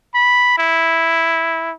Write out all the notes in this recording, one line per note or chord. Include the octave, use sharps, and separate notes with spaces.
B5
E4